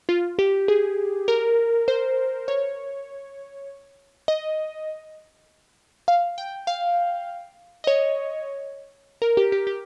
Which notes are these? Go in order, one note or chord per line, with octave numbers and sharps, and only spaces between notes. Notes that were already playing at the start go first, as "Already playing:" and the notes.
F4
G4
G#4
A#4
C5
C#5
D#5
F5
G5
F5
D#5
C#5
A#4
G4
G4
G4